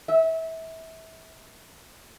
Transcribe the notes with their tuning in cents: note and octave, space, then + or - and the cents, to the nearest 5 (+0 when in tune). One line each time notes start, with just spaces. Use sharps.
E5 -25